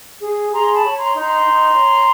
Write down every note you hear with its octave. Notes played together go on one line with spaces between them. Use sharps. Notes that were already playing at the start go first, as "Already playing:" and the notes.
G#4
G#4 A#5 C6
A5 B5
C#5
A#5 C6
D#4
A#5 C6
D#4
C#5